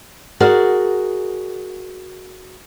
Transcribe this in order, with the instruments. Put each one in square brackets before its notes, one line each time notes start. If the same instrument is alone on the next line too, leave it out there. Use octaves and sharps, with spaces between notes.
[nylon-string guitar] F#4 G#4 A#4 D5